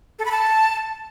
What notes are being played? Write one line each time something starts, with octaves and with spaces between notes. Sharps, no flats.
A4
B5
A5